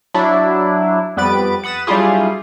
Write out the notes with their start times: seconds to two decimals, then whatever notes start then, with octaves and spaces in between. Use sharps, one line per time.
0.14 F#3 D4 E4
1.17 F2 G3 B3 B4 A6 D7
1.63 F#5 B5 D#6 A6 E7
1.87 F#3 G3 D4 E4 F4 G#4